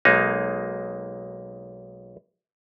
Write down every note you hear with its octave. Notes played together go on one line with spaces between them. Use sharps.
B1 G#3 A#3 D#4